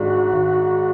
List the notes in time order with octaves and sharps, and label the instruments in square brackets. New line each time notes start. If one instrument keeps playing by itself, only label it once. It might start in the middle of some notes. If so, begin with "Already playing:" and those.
Already playing: [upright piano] G#1 G#2 G#3 D4 [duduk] F#4
[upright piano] G#1